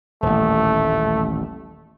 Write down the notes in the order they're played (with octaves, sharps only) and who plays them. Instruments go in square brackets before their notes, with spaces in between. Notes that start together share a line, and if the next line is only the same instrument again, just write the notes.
[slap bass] D#1 A1 [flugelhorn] A3